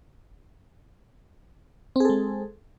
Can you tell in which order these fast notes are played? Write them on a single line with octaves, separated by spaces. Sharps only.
C4 G#4 A4 G#3